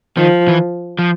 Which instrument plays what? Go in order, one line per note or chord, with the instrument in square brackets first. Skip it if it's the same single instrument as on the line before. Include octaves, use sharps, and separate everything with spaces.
[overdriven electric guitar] D#3 [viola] F3
[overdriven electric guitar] E3
F3